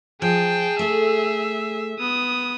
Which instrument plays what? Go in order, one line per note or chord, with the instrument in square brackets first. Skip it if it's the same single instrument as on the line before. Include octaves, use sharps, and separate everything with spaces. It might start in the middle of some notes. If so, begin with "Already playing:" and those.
[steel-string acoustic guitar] F3 [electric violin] G#4 [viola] G5 A5
[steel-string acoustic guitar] A3 A4 [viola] E5
[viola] B3 [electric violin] D#6